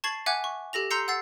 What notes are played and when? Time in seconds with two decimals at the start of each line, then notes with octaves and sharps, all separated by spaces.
0.04 A5 C#6 G#6 A6 C7 F#7
0.26 E5 F#5 G#5 D6 F#6 G#6
0.44 C#6
0.73 G4 A4 A#6 F7
0.91 A#5 C6 E6 G6 C7 C#7
1.08 F#5 E6 A6 C7